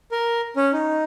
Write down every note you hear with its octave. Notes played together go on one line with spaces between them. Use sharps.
A#4
C#4
D#4